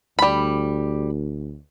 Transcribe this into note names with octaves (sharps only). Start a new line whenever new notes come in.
D2 G3 B5